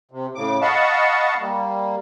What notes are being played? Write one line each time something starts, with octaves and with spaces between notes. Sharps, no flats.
C3
A2 C#3 D6
D#5 F5 F#5 A5 B5 C#6
G3 A#3